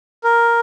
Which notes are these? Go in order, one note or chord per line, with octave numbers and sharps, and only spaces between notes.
A#4